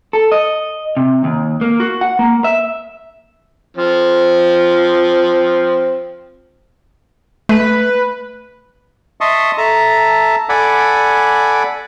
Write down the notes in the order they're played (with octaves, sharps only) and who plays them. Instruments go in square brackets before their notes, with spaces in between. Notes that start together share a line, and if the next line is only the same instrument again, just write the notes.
[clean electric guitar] A4
D#5
C3
D#2
A#3
F#4
F#5
A#3
E5
[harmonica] F3 C4
[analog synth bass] A3 [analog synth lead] B4
[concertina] D#5 E5 A5 C6 C#6 D#6
A4 E5 A5 A#5
A4 D5 F#5 G#5 B5 D6